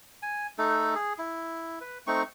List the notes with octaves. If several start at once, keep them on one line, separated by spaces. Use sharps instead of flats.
G#5
A3 D#4 A4
G#4
E4
B4
A3 C4 D#4 C#6